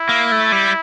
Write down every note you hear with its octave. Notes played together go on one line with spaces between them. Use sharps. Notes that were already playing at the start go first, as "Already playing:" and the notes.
Already playing: E4
A#3
A3
G3